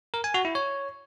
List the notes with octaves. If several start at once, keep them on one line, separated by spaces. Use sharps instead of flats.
A#4
G#5
F#4
E4
C#5